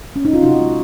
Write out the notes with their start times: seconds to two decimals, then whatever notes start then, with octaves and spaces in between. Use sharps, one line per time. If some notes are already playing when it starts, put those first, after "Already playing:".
0.16 C#4
0.25 D#4
0.33 F4
0.43 C3 D#4 F#4
0.59 G#3